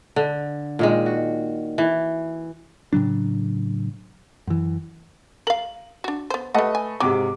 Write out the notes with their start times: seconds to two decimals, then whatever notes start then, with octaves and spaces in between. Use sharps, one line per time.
0.16 D3
0.79 A#2 D#3 G#3
1.06 F#4
1.78 E3
2.93 A2 C#3 F#3 D4
4.47 F#2 E3
5.47 A#4 F5 F#7
6.04 D4 F#4
6.30 B3 C5
6.54 G3 A3 B4 D#5 F#5
6.75 G#5
7.00 G#2 C3 F#3 D6